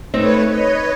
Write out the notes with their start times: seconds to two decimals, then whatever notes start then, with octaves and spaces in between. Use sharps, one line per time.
0.14 A3 C4 D#4 B4 C#5
0.48 B4 C#5 D#5